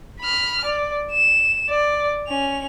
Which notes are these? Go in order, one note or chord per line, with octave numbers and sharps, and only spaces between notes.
B5 F6
D5
E7
D5
C#4 F7